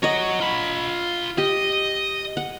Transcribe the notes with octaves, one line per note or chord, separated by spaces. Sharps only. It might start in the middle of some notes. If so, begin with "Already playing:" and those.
F#4 C#5 D#5 A#5
F4 B5
G4 D#5
F#5